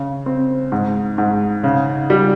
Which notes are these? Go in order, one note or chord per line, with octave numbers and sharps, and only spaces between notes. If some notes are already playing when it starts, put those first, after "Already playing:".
Already playing: C#3
C4
G#2
G#2
C#3
G3